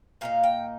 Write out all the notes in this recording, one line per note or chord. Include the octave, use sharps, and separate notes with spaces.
A#2 A#3 D#4 F5
G5